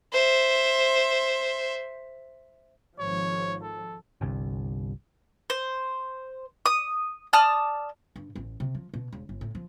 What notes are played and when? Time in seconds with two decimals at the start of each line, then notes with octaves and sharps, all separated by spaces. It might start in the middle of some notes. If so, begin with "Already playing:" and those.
0.12 C5 E5
2.99 G#1 F3 C#5
3.62 A4
4.21 G1 C2
5.50 C5
6.66 D#6
7.33 D5 A5 D#6 F6
8.16 G2
8.35 A1
8.60 C3
8.75 F3
8.94 B2
9.13 E1
9.29 G1
9.41 A2
9.55 F3